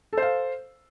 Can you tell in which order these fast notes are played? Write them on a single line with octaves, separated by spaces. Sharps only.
A4 C5 F5